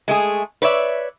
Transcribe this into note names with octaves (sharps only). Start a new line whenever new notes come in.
G#3 A3 G#4
B4 C#5 D5 E5